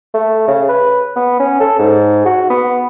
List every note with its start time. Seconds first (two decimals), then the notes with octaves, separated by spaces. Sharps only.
0.14 A3
0.48 C#3
0.69 B4
1.16 B3
1.40 C#4
1.60 A4
1.79 G#2
2.26 F#4
2.50 B3